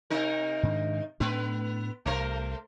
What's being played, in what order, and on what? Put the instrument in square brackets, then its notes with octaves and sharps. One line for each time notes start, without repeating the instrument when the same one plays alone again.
[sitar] C3 D#4 A#4
[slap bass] G#2 D#3 D4
[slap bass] A2 A3 D4 [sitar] B3 B4
[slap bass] C2 C3 [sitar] A3 A#4 C5